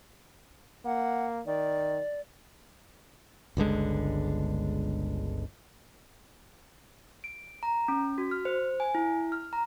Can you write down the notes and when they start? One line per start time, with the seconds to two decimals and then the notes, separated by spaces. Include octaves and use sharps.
0.85 A#3 F#5
1.47 D#3 D5
3.57 G1 C#2 D3 G#3
7.24 D7
7.63 A#5
7.88 C#4
8.18 F#4
8.31 F6
8.45 C5
8.80 G#5
8.95 E4
9.32 F6
9.53 A#5